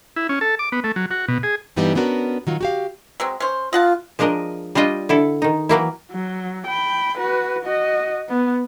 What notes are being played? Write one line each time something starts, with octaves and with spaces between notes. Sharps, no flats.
E4
C#4
A4
D6
B3
A3
F#3
F#4
B2
G#4
G2 E3 G3 B3 D#4
B3 C#4 D4 F#4 A#4
D#3 F#3 F4
F#4 G4 F5
F#3 G#3 C4
C#4 C5
F4 D#5 F#5 A5
F3 G#3 D4 A#4 D#5
G3 D4 F4 D#5 G5
D3 E4 A4
D#3 D#4
E3 F#3 A#3 E4
F#3
G5 B5
F#4 B4
F#4 D#5
B3